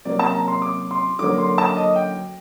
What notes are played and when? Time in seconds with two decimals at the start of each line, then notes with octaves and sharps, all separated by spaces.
0.05 C3 F#3 A#3 D5
0.19 A5
0.34 A#5
0.48 C6
0.62 D6
0.91 C6
1.19 D3 F#3 A#3 D6
1.38 C6
1.58 A5
1.76 D#5
1.96 G5